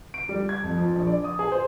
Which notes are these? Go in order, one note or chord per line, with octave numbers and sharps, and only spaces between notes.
D7
G3
G#6
F2
F3
A#1
D5
D#6
G#4
C5